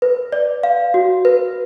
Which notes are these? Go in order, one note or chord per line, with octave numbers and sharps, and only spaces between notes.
B4
D5
F5
F#4
B4